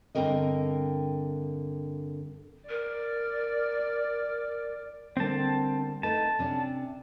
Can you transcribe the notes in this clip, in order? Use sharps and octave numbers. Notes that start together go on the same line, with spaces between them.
G2 D3 C4 C#4 A#4 D#5
A#4 D5
D3 G3 A#3 C4 A5
A3 D#4 B4 A5
C3 C#4 D4